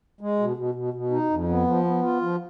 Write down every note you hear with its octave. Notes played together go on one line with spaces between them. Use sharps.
G#3
B2
B2
B2
B2
D#4
F2
B3
F3
B3
F4
F3